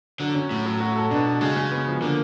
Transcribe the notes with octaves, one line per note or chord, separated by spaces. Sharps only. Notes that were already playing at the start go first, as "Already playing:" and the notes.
D3 F#3
C#4
A2 F#3
F#3
F#4
A4
B2 D4
F#4
C#3 G#3
G#3
B3
F3
D3 A#3